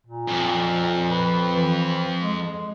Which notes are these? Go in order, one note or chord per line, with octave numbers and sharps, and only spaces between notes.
A#2
F2
B4
E3
G#3